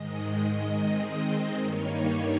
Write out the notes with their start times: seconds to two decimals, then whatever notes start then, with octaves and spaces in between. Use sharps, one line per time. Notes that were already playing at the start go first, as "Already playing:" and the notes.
Already playing: G#2 D#3 G#3 D#5
0.32 D#5
0.74 D#3 G#3 C4
1.61 G2 D#3 G3 A#3 D#4 C#5